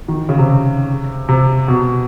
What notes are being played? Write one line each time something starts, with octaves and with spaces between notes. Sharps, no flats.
D#3
C#3
C3
C3
B2